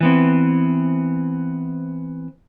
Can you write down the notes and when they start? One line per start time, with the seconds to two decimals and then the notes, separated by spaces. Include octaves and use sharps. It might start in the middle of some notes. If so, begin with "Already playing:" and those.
0.01 E3 B3 C4